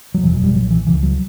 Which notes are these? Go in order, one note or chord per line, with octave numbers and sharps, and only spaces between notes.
F#3
F#1 E2 B2 E3
F#3
G3
B1 A#2 F#3
E3
C#2 C#3 E3
F#3